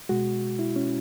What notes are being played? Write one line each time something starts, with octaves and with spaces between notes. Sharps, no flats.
B2 G#3 F#4
E4
C#4